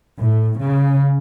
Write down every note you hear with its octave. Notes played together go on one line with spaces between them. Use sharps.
A2
C#3